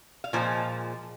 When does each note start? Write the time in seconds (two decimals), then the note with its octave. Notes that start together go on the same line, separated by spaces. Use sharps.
0.24 F5
0.33 A#2 F3 G#3